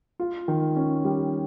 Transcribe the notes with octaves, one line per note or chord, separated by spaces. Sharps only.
F4
D#3
C#4
G3